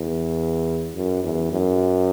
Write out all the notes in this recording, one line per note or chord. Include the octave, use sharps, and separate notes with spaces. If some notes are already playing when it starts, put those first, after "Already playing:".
Already playing: E2
F#2
E2
F#2